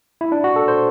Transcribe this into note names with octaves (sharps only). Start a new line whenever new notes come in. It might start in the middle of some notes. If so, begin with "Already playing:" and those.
E4
D4
F#4
A4
C5